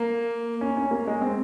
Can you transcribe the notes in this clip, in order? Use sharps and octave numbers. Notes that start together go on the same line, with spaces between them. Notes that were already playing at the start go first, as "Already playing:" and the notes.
Already playing: A#3
C#4
C#4
A#3
G#3
C4